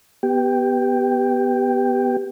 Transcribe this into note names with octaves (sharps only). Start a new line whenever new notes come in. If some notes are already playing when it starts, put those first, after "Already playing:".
B3 G4 G5